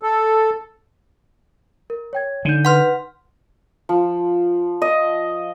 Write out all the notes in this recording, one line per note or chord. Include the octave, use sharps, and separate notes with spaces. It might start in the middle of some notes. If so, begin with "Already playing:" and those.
A4
A#4
C#5 G5 G#6
D3 D#4 G6
B4 F#5 C6 F6
F3
D#5